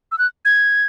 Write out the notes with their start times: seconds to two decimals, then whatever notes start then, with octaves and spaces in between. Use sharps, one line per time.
0.12 E6
0.18 F#6
0.45 G#6